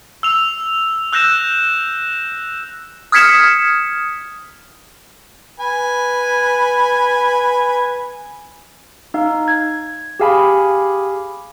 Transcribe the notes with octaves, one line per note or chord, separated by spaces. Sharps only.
E6 F7
E6 F#6 G6 A#6 E7
D#6 F6 G#6 B6 C#7 E7
B4 G#5
D#4 F5
G#6
G4 G#4 F5 G#5 B5